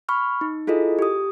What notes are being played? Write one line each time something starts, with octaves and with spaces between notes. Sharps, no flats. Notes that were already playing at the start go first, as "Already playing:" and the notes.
B5 C#6 F6
D#4
E4 F4 G#4 A4 D#5
G4 D#6